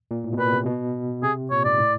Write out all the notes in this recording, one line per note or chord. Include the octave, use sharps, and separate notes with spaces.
A#2
A2
B2
A#2 B4
C3
B2
C3 G#4
A#2 C#5
G#2 D5
A2